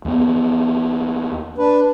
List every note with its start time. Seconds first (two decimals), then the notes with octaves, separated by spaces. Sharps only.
0.05 D#2 B3
1.58 D4 B4